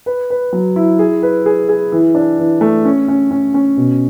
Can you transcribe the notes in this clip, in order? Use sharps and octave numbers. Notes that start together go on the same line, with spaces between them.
B4
B4
F#3
E4
G#4
B4
G#4
G#4
E3
D4
E3
A3
C#4
C#4
C#4
C#4
B2